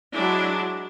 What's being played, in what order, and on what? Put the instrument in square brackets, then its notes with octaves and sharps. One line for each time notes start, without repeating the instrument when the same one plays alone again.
[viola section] F#3 G#3 D4 E4